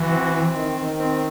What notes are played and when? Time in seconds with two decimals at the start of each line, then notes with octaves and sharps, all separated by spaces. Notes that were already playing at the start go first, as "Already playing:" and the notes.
Already playing: E3 F#4
0.10 C4
0.32 C4
0.54 D#3
0.77 D#3
0.99 C4